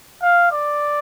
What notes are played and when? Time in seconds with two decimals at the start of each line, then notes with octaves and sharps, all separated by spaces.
0.23 F5
0.52 D5